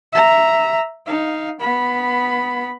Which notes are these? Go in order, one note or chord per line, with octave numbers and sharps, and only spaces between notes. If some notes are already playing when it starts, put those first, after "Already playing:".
E5 A#5
D#4 F5
B3 B5